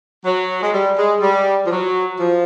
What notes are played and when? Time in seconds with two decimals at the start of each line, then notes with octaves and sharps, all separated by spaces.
0.24 F#3
0.63 G#3
0.72 G3
0.97 G#3
1.21 G3
1.65 F3
1.71 F#3
2.19 F3